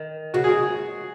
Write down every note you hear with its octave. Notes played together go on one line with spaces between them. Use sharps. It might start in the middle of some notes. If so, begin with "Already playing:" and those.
Already playing: D#3
C#3 F#4
G#4